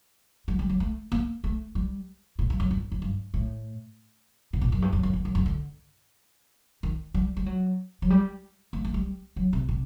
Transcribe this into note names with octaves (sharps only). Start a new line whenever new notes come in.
G3
G3
F#3
A3
A#3
A3
G3
A#2
G2
F#2
G2
G2
G2
A2
C3
A#2
F#2
G2
F#2
F#2
G2
F#2
G2
D3
D#3
G3
G3
F#3
F#3
G3
A3
A3
G3
F#3
C3
C3